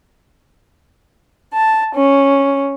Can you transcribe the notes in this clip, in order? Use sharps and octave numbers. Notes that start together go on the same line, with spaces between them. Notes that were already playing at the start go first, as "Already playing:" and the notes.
A5
C#4